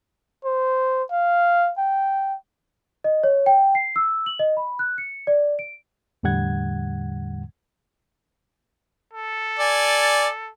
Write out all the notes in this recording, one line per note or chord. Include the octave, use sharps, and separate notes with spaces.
C5
F5
G5
D#5
C#5
G5
C7
E6
F#7
D#5
B5
F#6
C#7
D5
D7
E2 A2 D3 G3 F#5 G#6
A4
D5 G#5